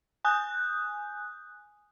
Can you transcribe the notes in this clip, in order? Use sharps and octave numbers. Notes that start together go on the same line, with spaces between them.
G#5 D#6 F#6 G6